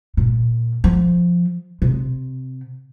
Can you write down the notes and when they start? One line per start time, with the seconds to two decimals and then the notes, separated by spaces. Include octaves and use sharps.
0.17 A#2
0.84 F3
1.82 C3